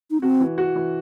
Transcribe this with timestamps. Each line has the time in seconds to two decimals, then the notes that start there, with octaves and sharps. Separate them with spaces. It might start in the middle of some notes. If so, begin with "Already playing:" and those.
0.11 D#4
0.21 C4 F#4
0.40 E3
0.58 F#4
0.75 E3